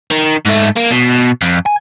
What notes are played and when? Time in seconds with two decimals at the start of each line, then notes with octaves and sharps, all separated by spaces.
0.11 D#3
0.45 G#2 A3
0.76 A#3
0.91 B2
1.42 F2
1.66 G#5